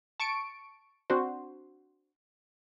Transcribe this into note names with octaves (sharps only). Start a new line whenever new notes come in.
A5 C#6 C#7 D7
C4 D4 F#4 C5